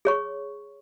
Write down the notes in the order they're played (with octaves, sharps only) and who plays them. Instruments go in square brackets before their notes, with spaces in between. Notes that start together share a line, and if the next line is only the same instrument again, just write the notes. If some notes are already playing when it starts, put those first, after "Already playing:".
[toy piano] G#4 C#5 C#6